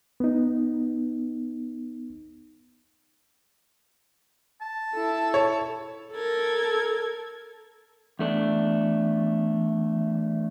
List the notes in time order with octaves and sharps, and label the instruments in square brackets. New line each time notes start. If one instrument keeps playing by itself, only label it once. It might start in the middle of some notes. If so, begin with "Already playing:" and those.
[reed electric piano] B3 D#4
[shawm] A5
[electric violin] E4 A4
[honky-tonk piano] C#5
[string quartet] A4 A#4 G#6
[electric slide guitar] E2 A3 D4